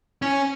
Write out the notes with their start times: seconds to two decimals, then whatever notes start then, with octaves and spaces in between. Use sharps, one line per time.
0.22 C#4